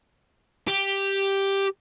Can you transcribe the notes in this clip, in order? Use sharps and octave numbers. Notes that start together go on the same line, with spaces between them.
G4